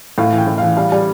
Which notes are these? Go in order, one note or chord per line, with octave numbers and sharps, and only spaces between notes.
A2 F5
E3
G5
A2
E3 F5
G3 F5
G3